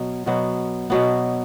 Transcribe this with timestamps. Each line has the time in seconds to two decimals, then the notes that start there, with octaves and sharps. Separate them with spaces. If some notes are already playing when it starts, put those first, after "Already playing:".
Already playing: B2 F#3 B3
0.26 B2 F#3 B3
0.90 B2 F#3 B3